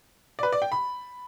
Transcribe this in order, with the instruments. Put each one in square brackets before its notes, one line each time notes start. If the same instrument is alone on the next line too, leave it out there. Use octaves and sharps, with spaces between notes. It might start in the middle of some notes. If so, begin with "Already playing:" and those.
[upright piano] D5
B4
D5
G5
B5